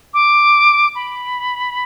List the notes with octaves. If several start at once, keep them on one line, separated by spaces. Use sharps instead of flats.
D6
B5